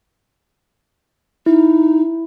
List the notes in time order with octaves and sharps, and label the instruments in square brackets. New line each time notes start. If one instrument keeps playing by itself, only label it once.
[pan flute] D#4 [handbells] E4